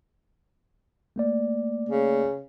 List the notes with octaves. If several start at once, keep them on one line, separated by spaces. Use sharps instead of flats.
A3 A#3 D5
C#3